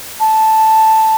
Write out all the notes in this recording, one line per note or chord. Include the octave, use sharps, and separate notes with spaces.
A5